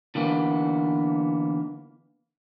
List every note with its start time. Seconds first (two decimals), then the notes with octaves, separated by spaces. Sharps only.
0.15 D3 E3 A#3 B3